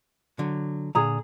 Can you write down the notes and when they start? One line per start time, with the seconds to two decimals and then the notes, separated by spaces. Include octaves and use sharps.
0.39 D3 F#3
0.95 A#2 D3 G#4 A#5